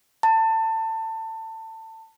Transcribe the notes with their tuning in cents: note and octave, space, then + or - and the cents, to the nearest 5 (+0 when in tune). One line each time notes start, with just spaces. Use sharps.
A5 +25